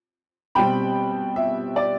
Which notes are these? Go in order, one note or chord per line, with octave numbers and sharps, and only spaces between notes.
B2 G3 C4 G5 B5
E5
D5